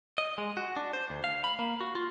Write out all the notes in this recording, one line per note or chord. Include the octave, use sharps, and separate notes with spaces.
D#5
G#3
F#4
D4
C5
D2
F5
B5
A#3
F#4
F4